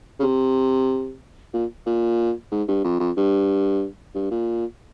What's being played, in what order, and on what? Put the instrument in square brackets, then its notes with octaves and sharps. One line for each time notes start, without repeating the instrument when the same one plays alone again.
[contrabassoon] C#3
C3
A#2
A#2
G#2
G2
F2
F2
G2
G2
A#2